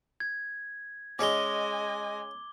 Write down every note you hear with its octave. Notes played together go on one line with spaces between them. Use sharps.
G#6
G#3 C#4 G#4 C#5 D#5 G#5 D6 G7